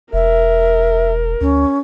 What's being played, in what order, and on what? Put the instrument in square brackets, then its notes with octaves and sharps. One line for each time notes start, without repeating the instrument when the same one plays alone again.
[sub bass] E1 [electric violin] A#4 [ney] E5
[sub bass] D2 [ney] C#4